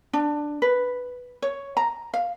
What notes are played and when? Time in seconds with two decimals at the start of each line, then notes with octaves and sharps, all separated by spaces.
0.13 D4
0.62 B4
1.42 C#5
1.77 A#5
2.14 F5